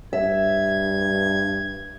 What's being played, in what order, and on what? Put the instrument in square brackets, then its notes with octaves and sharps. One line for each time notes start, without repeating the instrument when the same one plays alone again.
[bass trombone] G2 [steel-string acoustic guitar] E5 [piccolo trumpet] G#6